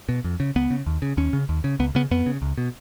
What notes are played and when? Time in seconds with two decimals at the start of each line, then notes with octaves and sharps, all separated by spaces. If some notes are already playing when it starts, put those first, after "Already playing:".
0.09 B2
0.24 F2
0.40 C#3
0.56 C#2 B3
0.70 C#3
0.86 D#2
1.02 C#3
1.17 D#2 C#4
1.33 C#3
1.49 D#2
1.64 C#3
1.79 C#2 B3
1.95 C#3 B3
2.11 F2 B3
2.26 C#3
2.42 C#2
2.58 B2